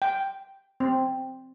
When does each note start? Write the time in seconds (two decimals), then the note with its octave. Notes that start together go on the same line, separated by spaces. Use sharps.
0.02 G5
0.80 C4